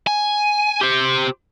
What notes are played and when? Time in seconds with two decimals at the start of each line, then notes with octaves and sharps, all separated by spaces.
0.07 G#5
0.81 G4 C5